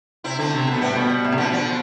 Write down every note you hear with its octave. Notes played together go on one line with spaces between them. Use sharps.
C3 C4 E4
D3 A3 C4
C3
B2 A3
A2 G3 B3
B2
B2
A2
C3
B2 D3 F3
D3 F3